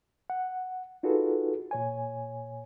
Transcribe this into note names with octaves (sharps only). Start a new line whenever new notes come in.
F#5
D#4 F4 F#4 G#4 A4 B4
A#2 C#5 G#5